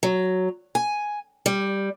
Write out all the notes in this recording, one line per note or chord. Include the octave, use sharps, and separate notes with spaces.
F#3
G#5
G3